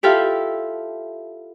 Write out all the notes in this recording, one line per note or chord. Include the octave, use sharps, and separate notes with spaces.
E4 F4 G4 A4 E5 F5